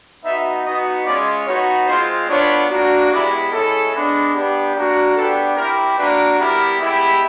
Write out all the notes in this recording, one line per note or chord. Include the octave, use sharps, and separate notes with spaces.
B3 D#4 F#4 E5
B3 D#4 F#4 D#5
G#3 C#4 F4 D5
B3 D#4 F#4 C#5
G#3 C4 F4 C5
B3 D4 F4 C#5
A#3 D4 F#4
G#3 B3 E4 G4 D5
G#3 C#4 E4 A4
G#3 B3 D4
B3 D4 G4
A#3 D4 F#4
B3 D4 G4 A4
C4 E4 G4 A#4
A#3 D4 F#4 B4
G3 B3 E4 G4 A#4
G#3 B3 E4 G4